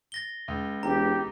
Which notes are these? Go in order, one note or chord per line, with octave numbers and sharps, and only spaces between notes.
A6 A#6 G7
C#2
E1 G4 A#5